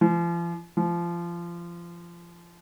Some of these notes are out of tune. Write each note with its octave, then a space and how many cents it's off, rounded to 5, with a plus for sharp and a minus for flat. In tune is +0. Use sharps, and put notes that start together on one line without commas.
F3 -40
F3 -25